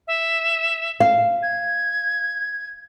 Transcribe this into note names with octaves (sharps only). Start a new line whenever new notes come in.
E5
F5
G#6